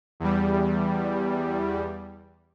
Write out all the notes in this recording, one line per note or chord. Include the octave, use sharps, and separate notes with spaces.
E2 G3